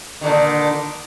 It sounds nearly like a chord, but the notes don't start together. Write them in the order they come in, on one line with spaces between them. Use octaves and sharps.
D#3 D3 A#2